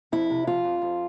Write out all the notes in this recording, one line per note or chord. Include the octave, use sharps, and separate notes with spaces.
F2 E4
C3
F3 F4
F2
F2